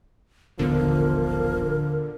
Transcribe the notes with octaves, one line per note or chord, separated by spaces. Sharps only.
D#1 A1 D3 F3 B3 A#4